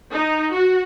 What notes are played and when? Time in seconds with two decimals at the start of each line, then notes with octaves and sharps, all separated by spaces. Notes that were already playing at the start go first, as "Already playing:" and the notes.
0.13 D#4
0.53 F#4